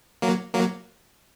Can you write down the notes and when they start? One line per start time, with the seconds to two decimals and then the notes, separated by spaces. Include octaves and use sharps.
0.22 F#3 A#3
0.54 F#3 A#3